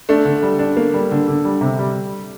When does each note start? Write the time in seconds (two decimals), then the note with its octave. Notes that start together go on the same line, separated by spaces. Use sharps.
0.09 A3 D4
0.25 D3
0.43 G3
0.59 D4
0.77 A#3
0.94 G3
1.11 D3
1.28 D3
1.45 G3
1.61 C3
1.79 G3